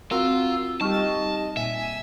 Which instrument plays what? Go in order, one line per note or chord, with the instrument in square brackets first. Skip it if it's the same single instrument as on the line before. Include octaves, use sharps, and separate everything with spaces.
[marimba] C4 [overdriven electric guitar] F4 [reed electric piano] F#4 A#4 [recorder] E6
[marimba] G3 C#6 F6 [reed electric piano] D#4 G4 [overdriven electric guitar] A5
[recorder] D#5
[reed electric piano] A#2 [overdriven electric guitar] E5 [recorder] G#5
[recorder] G#5